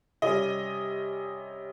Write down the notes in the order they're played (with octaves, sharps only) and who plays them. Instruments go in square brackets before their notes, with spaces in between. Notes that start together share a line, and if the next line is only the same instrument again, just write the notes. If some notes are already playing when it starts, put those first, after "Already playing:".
[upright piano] C3 G3 C#4 D#5